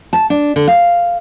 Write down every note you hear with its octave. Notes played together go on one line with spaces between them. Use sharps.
A5
D4
D3
F5